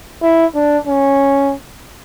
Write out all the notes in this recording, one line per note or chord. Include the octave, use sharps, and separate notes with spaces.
E4
D4
C#4